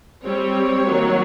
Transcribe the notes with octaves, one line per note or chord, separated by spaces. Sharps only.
G3 C4 C#5
D#3 F#3 A#3